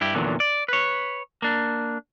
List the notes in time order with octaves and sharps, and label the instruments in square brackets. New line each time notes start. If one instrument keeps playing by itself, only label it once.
[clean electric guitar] G2 E4 G4
E2 A#2 D3 D#3 F#3
D5
B4 C#5
A#3 D4